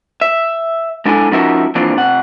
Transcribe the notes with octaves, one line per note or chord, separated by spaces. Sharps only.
E5
G#3 D4 E4 A4 G#5
F3 C#4 D#4 F#4 A#4 E5
E3 F3 A#3 C4 D4 F4
C3 F#5